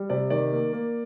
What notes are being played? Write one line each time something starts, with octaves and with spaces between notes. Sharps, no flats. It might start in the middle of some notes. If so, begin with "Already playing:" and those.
Already playing: G3
C3 D5
D#3 D5
A#3
A#3